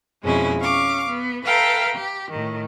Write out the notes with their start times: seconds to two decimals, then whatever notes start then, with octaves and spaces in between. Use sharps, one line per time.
0.22 F2 B2 G#3 C#4 E4
0.61 C#4 F5 C#6 D6
1.09 B3
1.44 A4 B4 E5 F5 G5 A#5
1.94 G4
2.30 A2 D#3